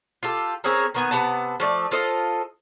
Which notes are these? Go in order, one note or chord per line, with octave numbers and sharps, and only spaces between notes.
F4 G4 A4
C4 C#4 G#4 A#4
D#3 B3 G#5
C3 B3 F#5 A5
F3 A3 D5
F4 A4 C5 D#5